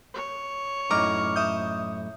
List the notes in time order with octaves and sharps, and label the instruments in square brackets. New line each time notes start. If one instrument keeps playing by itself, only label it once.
[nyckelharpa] C#5
[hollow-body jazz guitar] F#2 A2 D#4 [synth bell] A#5 D6 F6
[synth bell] E5 D#6 G6